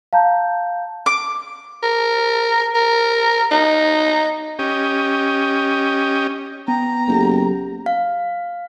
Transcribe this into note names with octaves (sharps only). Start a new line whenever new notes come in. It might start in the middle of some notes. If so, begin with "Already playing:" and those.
F5 A5 A#5 G6
D6
A#4
A#4
D#4
C#4 G4 D#5
B3 G5 A#5
F#1 F#3 G4 A4
F5